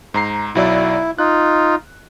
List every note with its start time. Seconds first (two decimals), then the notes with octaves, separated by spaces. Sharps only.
0.14 G#2 A#5 C7
0.55 B1 F#3 E4 D5
1.19 D#4 F4 F#6